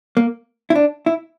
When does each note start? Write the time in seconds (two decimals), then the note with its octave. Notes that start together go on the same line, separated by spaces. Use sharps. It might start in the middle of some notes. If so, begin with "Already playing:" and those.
0.17 A#3
0.70 E4
0.75 D4
1.06 E4